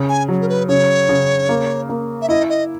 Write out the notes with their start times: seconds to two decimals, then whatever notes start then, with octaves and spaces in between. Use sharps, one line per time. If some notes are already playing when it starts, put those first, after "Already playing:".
Already playing: C#3
0.09 G#5
0.28 F#3
0.41 A#4
0.49 B4
0.68 C#3 C#5
1.09 C#3
1.49 A#3
1.89 A#3
2.22 E5
2.29 E4 D#5
2.49 D#5